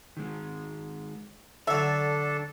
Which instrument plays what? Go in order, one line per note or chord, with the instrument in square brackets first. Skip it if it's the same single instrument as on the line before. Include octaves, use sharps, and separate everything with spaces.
[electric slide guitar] D#3 G#3
[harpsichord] D3 F#3 [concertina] D4 A4 [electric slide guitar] D5 [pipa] E5